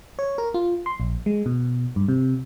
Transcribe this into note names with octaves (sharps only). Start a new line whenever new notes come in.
C#5
A#4
F4
C6
A#1
G#3
B2
G2
C3